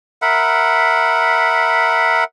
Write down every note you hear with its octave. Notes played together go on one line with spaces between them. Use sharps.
A#4 E5 F#5 B5